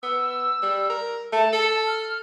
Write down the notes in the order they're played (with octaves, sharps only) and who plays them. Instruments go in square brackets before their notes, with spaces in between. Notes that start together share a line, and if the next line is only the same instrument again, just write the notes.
[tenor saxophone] B3 [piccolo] E6
[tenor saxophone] G3
A#4
[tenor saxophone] A3 [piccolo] A5
[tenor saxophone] A4
[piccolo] F6